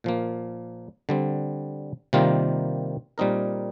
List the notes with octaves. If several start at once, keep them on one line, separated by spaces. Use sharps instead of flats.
A#2 F3 A#3
D3 G3 C4
C3 D#3 G3 A#3 F4
A#2 G3 C4 D#4 A#4